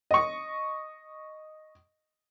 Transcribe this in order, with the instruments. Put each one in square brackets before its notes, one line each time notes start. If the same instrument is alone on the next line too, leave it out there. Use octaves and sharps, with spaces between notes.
[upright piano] D#5 C#6